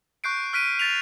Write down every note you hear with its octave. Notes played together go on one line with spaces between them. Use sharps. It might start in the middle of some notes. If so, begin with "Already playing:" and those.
C#6 F#6 G6 C7 D7
F6 F#6 B6 D7 D#7
A6 B6 F7